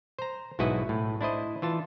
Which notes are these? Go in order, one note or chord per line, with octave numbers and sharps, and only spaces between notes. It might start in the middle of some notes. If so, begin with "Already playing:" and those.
C5 A#5
B1 G#2 E4 F#4 B4 D#5
A2
D4 E4 C5 D#5
E3 F4 A5